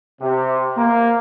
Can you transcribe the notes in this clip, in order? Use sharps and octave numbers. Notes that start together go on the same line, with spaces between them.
C3
A#3